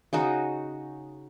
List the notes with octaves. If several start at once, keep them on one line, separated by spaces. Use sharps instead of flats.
C#3 D#4 F#4